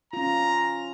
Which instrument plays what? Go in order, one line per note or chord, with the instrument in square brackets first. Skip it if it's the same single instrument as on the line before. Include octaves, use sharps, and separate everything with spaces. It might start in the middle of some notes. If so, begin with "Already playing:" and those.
[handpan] C#4 F4 [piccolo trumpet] A#5